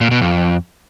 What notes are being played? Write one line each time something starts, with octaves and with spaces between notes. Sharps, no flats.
A#2
B2
F2